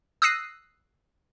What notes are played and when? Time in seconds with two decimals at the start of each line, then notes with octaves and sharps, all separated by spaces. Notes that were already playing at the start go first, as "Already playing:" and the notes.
0.22 D#6 E6 F#6 A#6 C7 D#7